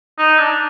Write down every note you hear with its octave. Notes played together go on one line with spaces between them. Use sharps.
D#4
D4